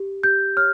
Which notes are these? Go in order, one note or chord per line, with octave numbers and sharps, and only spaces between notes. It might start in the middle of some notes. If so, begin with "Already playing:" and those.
Already playing: G4
G4 G6
C#5 F6